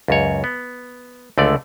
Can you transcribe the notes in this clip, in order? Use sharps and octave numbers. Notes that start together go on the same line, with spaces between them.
C#2 F#2 C#5
B3
C#2 D3 A3 D5